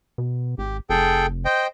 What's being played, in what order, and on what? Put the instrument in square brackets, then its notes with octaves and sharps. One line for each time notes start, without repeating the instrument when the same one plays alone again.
[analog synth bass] B2
[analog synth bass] G#1 [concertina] G4
[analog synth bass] F1 [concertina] G#4 A4 G5
[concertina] C5 D#5 G5